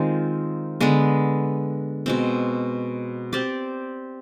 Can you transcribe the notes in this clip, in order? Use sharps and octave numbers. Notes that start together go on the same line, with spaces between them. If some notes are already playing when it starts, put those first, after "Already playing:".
Already playing: D#3 G#3 C4 F4
D3 G#3 B3
B2 G#3 C4
C4 G4 D5